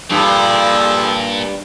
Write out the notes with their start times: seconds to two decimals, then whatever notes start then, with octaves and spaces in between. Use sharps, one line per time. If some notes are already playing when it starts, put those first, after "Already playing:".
0.11 G2 A#2 F3 G#4 A4